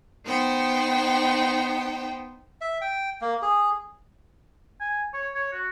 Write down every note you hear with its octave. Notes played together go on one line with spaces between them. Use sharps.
B3 D#4 C5 G5
E5
G5
A#3
G#4
G#5
C#5
C#5
F#4